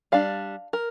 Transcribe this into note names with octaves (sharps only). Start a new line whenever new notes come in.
G3 D4 F5
A#4